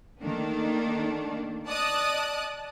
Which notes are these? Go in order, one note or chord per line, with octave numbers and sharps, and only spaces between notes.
D#3 A3 A#3 D4
D5 D#5 A5 D#6 F#6